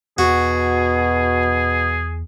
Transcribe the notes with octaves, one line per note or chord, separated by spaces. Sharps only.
E2 B2 F#4 G#4